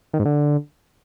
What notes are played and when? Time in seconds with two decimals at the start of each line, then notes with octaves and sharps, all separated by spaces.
0.13 D#3
0.19 G#2
0.25 D3